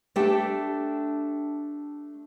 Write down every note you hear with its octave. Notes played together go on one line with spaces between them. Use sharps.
A3 D4 G4 A4 G5